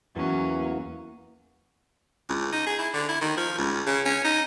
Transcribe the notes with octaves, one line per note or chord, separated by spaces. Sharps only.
E2 E3 F#3 A#3 C#4
C#2
D#4
G#4
E4
D3
E4
D#3
F3
C#2
C#3
C#4
D#4